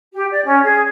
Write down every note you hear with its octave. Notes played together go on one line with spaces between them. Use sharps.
G4
D5
C#4
G#4